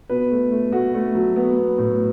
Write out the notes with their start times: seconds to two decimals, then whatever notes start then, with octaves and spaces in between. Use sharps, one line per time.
0.09 B2 B4
0.31 A3
0.51 A3
0.72 A3 F#4
0.94 A3
1.15 F#3
1.36 B3
1.57 B3
1.78 A2